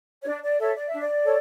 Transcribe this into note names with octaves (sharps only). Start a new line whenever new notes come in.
C#5
D4 D5
D5
A4 C#5 E5
D5
E5
D4
D5
A4 C#5